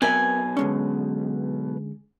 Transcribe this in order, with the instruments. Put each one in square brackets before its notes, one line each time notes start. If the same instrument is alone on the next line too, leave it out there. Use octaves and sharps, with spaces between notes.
[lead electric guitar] B1 B2 [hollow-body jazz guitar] C4 A#4 E5 [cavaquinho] G#5
[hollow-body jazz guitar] D3 G#3 C#4